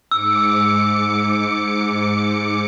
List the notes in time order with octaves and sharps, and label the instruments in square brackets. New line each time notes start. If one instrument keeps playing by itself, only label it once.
[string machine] G#2 D6 C#7 [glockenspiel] E6